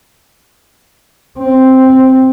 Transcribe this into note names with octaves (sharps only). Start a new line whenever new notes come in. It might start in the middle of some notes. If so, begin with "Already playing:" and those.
C4